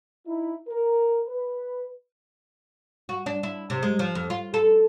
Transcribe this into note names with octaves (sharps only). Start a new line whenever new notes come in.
D#4 E4
A#4
B4
F#4
D4
E4
C3
G#3
F3
F2
F4
A4